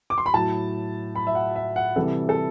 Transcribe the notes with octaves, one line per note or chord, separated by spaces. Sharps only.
D6
C6
B5
A2 F#3 A5
B5
E5
F#5
E5
F#5
C3 E3 G3 A4
A4